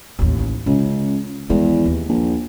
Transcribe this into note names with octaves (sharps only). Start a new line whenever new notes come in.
A1 D#2
C#2 C#3
E2 D#3 G#3
D#2
A#1